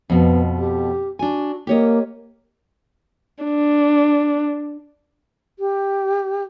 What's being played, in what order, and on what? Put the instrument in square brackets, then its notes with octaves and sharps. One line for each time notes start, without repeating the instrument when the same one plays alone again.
[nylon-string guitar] F2 B2 [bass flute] B3
[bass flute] G4
[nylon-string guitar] D4 G#5 [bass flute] F#4
[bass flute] A#3 [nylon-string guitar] G4 C#5 D#5
[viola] D4
[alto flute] G4